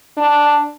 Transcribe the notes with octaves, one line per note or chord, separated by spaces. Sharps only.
D4